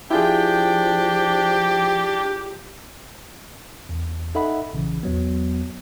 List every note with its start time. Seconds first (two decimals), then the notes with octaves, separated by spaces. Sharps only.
0.11 F3 D4 E4 F4 G4 G#4 G5
3.89 E2
4.35 D#4 A4 D#5 E5 F#5 B5
4.73 A#1 C#3 E3
5.03 E2 F#3 B3